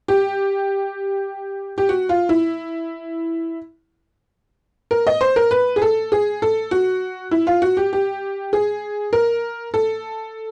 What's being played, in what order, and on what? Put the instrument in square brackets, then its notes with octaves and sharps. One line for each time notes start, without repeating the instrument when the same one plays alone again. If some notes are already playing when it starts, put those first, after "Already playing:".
[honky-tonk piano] G4
G4
F#4
F4
E4
A#4
D#5
C5
A#4
B4
G#4
A4
G#4
A4
F#4
E4
F4
F#4
G4
G4
G#4
A#4
A4